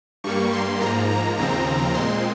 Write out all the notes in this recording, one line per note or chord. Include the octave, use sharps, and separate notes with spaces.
G2 G3 A#3 C#6
C6
G#2 F3 A#3 A#5
A#5
D#2 C#3 F3 C4 A#5
A#2 G#3 C4 C6